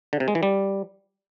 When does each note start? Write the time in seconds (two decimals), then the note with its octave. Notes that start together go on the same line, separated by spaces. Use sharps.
0.13 D3
0.20 C3
0.28 G#3
0.35 E3
0.43 G3